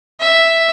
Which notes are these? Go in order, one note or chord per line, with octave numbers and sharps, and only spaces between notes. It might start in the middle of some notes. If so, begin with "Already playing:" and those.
E5